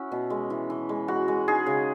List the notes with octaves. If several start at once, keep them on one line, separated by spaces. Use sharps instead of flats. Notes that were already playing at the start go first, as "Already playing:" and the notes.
Already playing: C#4 E4 F#4
B2
G#3
E3
E3
G#3
G#3 F#4
G#3
D#4 G#4
C#3